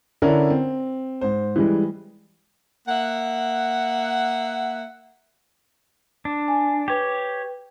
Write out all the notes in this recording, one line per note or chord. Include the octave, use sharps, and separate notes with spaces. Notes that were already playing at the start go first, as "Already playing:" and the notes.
D3 C#4 D4 E4 A#4
C4
G#2 C5
E3 G3 G#3
A#3 E5 F#5
D4
G#5
G4 B4 C#5 G5